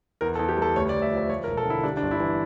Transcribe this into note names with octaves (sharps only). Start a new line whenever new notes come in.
E2 A#4
A4
E2
G4
G3 A4
D2 C#5
D5
D2
E5
F3
E5
F3 C#5
A#4
E1
A4
D3 E4
G3 D4
D4
G1
E4
E3